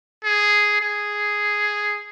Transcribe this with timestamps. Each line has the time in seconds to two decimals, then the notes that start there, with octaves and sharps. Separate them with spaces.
0.24 G#4
0.81 G#4